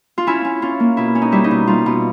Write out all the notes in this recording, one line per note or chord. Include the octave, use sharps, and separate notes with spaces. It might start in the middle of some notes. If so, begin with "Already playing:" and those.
F4
C#4 E4
C#4
C#4 F4
A#3
B2 E4
C#4
D#4
G3 E4
D#4
B2
G3 F4
B2